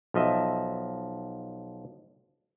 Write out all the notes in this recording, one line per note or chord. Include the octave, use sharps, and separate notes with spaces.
B1 F3 D#5 E5